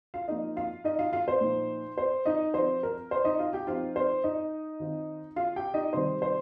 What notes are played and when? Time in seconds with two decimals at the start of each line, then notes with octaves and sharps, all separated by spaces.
0.14 F4 F5
0.28 F3 A#3 D#4 F4 D#5
0.57 F4 F5
0.84 D#4 D#5
0.99 F4 F5
1.13 F4 F5
1.28 C5
1.41 A#2 F3 D#4
1.98 C5
2.26 D#4 D#5
2.54 F3 C4 F4 C5
2.83 A#4
3.11 C5
3.25 D#4 D#5
3.39 F4 F5
3.53 G4 G5
3.67 F3 C4 D#4 F4 F5
3.96 C5
4.24 D#4 D#5
4.80 D#3 C4 F4
5.36 F4 F5
5.56 G4 G5
5.74 D#4 D#5
5.93 C3 D#3 G3 C5
6.22 C5